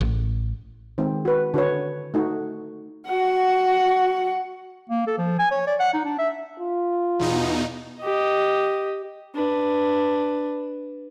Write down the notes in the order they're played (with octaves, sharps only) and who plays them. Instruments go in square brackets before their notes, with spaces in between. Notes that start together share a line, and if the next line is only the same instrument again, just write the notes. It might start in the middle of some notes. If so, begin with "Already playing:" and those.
[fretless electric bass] A1
[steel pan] D#3 G#3 C4
F#4 B4
D3 F#4 B4 C#5
A3 D#4 F#4
[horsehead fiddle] F#4 F#5
[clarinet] A#3
A4
F3
G#5
C#5
D5
F#5
D#4
D4
E5
[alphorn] F4
[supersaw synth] E2 B2 D#4
[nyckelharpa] G4 D#5
D4 B4